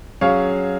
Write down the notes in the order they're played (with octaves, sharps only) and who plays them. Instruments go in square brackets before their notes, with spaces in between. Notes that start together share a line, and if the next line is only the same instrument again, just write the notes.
[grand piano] F#3 C#4 G#4 [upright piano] C#5 F5